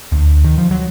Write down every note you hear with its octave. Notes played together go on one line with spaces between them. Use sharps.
D2
D#3
F3
F#3